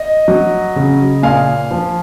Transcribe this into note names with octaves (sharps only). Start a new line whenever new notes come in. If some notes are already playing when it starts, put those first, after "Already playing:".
Already playing: D#5
F#3
C#3
A#2 F5 G#5
F3